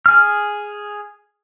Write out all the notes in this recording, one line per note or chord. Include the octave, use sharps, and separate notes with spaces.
G#4 F6